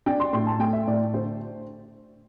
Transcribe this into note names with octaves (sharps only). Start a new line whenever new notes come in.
D4 G5
C6
A2 C6
A5
A3 G5
E5
A2 D5
D3 C5